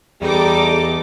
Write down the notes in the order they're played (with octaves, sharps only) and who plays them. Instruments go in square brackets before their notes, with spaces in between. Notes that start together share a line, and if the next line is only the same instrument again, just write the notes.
[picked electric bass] E2 [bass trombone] G3 [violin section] D#4 A4 D6 [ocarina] G#4